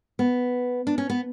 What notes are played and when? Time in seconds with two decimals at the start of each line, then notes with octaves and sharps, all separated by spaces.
0.19 B3
0.87 D4
0.98 C#4
1.10 B3